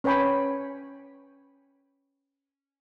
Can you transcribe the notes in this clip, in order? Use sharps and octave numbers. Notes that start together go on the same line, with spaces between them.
C#4 B4 C#5 G5 G#5 B5